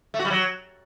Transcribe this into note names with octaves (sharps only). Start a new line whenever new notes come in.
A3
F#4
G3
F#3